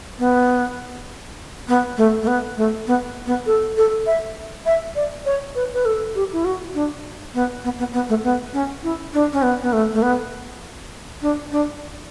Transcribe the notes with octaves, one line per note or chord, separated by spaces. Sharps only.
B3
B3
A3
A3
B3
A3
B3
B3
A4
A4
E5
E5
D5
C#5
B4
B4
A4
G4
E4
F#4
D4
B3
B3
B3
B3
A3
B3
C#4
E4
D4
C#4
B3
B3
A3
A3
B3
D4
D4